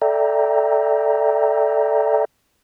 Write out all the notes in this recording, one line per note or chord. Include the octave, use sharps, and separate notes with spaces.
A4 D5 E5 G5 A#5